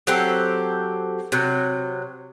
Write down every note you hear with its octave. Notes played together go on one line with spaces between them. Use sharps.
F#3 C4 G4 A4
C3 F#3